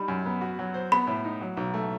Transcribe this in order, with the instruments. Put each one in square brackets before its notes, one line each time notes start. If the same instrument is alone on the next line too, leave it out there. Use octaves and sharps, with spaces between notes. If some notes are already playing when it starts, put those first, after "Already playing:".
Already playing: [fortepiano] G3 D#4 [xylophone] B5
[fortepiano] F#2
B3
F#4
F#3
C5
[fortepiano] B3 [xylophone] B5
[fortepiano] A2
D#4
F#3
B1
A3